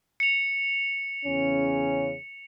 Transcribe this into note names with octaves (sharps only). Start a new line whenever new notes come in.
C#7 F7
E2 C#3 C#4